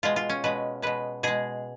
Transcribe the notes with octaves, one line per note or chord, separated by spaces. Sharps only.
B2 G#3 F4
F4
C#4
B2 G#3 B4
B2 G#3 B4
B2 G#3 G#4